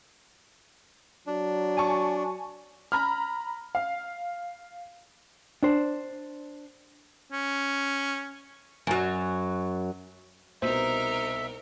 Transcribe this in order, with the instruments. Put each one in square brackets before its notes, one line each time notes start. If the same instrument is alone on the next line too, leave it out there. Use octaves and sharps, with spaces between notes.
[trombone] F#3 [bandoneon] D4
[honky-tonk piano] G#5 A5 C#6
A#5 B5 F6
F5
[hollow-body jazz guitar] D4 C5
[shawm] C#4
[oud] F#2 F#3
[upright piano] C2 B2 [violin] D#4 A#4 [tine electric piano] C5 [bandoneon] E5